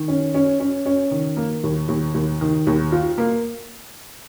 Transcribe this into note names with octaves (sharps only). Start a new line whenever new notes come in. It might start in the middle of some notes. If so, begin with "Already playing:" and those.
Already playing: D#3
C#4
C#4
C#4
C#4
D#3
A#3
D#2
D#2
D#2
D#3
D#2
F4
A#3